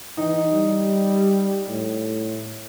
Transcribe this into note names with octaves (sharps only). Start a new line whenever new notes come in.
E3 D#4
G3
A2